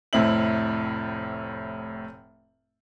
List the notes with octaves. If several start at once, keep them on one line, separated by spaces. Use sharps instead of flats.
F1 A2 C4 E4 F#7